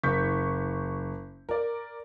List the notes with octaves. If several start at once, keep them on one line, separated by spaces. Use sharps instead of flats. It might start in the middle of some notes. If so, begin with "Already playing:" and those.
F#1 C#6 G6 B6
A#4 D5